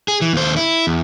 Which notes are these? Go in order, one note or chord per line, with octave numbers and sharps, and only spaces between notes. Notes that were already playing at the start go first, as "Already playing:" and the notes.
G#4
E3
D#2 C5
E4
E2